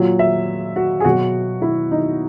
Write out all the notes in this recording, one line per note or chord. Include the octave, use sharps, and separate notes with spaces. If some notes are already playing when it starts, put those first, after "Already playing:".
Already playing: A#2 F#3
E5
F#4
G#4
B2 F#3 F#4
E4
D#4